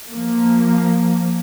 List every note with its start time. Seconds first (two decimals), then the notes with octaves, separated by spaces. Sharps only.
0.11 F3 A#3